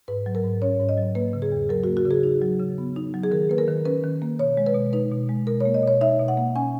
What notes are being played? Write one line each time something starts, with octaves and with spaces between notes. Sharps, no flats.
G#2 B4
F#3
A#4
G#2
C#4 C#5
G#2
D#5
F#3
A#3 B4
C#3
G#4
E2
F#3 A#4
F#4
A#3
F#4
C#3
G#4
D#4
F#3
C#3
B3
D#4
F#3
G#4
D#3 A#4
A#3 B4
A#4
D#3
C#4 B4
D#3
A#3
B2 C#5
G#3
B4
B2
D#4 B4
B2
G#3
B2 A#4
C#5
A#3
D#5
B2 C#5
D#4 E5
B2
F#5
A#3
C#4 G#5